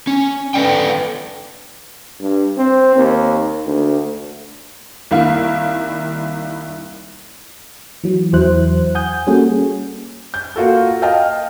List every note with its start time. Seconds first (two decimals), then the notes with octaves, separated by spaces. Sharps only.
0.07 C#4
0.54 A4 B4 C#5 D5 G5
2.20 G2
2.57 C4
2.96 D#2
3.66 D2
5.11 C2 D#3 A#3 E4 F5
8.04 E3 F#3
8.33 E2 F#3 E4 C5 F#6
8.95 F#5 G#5 D#6 G6
9.27 G3 A#3 C#4 F#4 G#4 A4
10.34 G6
10.56 A#3 F4 F#4 A4
11.02 D#5 F5 G5 A5 F6